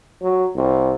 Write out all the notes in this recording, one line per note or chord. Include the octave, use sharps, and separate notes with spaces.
F#3
C2